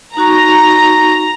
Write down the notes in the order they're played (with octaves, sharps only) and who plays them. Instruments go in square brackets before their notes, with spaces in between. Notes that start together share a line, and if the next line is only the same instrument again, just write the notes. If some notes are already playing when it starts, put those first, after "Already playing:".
[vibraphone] D#4 F#4 C#6 [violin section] A#5